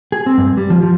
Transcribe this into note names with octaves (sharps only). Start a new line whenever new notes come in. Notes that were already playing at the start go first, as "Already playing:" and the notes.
G#4
C4
G2
G3
F3
F3